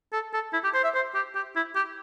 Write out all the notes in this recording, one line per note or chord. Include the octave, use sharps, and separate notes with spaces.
A4
A4
E4
G4
C5
E5
C5
G4
G4
E4
G4